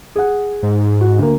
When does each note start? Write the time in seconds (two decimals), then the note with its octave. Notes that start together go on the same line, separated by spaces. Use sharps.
0.16 G#4 F#5
0.63 G#2
1.01 F#4
1.19 D2 A#3